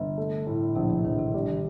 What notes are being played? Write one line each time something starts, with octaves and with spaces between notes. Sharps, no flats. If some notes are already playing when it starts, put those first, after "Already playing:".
Already playing: G1 C3
A3
A2
A#2
A#1 C3
C3
A#1 D#3
C3
G3
D#3